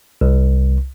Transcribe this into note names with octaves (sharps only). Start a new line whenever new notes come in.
C2